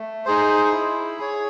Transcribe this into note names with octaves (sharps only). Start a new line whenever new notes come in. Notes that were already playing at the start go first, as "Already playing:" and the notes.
Already playing: A3
D#4 G#4 C5
E4
G#4 C#5